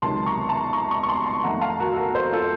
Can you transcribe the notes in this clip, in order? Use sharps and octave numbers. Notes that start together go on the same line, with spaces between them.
C#2 C3 D#3 F#3 A5 C6
A#5 C#6
A5 C6
A#5 C#6
A#5 C#6
C#6
A5 C6
A5 C6
F2 D#3 A3 F#5 A#5
F5 A5
F#4 A#4
A4
F#4 A#4
A4 C5
F4 A4